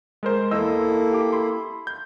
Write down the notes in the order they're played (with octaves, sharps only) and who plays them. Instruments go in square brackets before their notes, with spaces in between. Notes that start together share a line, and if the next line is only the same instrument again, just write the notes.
[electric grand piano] G#3 A#4 C5
[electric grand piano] E2 D#5 E6 [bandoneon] A#3 E4 A4
[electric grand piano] G4 D6
B5 C6
G6